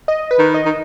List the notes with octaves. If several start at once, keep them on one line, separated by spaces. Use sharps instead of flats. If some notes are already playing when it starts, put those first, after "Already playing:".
D#5
B4
D#3
D#5
D#3